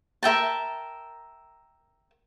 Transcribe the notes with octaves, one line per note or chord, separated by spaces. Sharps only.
A#4 E5 G5 A5